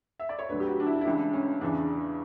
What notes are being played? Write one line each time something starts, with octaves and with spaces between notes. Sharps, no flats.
E5
D5
C#5
D2 D3 F#3 B4
G4
F#4
D4
E4
E4
C#2 C#3 E3 D4
C#4
E2 C#3 E3 D4